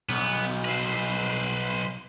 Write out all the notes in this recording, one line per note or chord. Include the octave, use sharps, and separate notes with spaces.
B1 B3
B4 C5